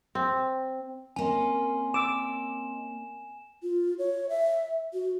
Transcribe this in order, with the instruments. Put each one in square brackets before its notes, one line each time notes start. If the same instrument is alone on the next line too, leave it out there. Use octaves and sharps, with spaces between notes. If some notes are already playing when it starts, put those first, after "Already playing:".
[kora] C4
[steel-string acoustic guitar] A#3 C#4 [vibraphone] C4 D#5 C6 [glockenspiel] G#5
[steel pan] D6 E6 [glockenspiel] E7
[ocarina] F4
C#5
E5
F#4